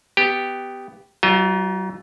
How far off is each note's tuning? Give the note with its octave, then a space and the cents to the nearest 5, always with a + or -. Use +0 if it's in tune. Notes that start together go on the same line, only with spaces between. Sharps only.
B3 +15 G4 +0
F#3 +40 F4 +0 D#5 +40